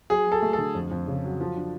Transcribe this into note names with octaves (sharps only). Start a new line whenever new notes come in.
F#3 G#4
F#3 A4
A3
A4
D3
F2
F2
C#3
F#3
F3
D4